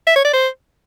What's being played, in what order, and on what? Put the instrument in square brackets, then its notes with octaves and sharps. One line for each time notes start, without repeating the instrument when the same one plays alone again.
[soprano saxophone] E5
C#5
D5
C5